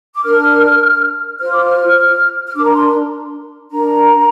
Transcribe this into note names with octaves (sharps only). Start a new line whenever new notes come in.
D6
D4 A#4 F6
F4 C5 F6
D6
F6
F6
D4 A#4 D6
A#5
C6
D4 A#4 A#5